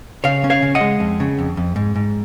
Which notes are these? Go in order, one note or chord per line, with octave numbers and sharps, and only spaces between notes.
C#3 C#5 F5
C#4
C#5 F5
C#3
D#5 F#5
G#3
F2
C#3
F2
F2
G#2
G#2